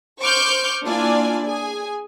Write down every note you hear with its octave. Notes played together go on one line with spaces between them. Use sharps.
C5 C#6 D6 F6 G6
A#3 D4 E4 F4 D5 G#5
G#4 G#5